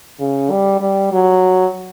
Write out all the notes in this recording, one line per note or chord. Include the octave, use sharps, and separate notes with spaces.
C#3
G3
G3
F#3